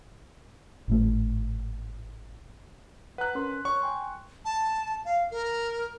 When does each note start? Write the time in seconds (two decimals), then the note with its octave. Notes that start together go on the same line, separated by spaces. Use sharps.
0.88 G#1 A2 A3
3.18 B4 F#5 A#5 F#6
3.35 C#4 A#4 C6
3.65 C#5 C#6
3.82 G5 G#5 C6
4.45 A5
5.05 F5
5.31 A#4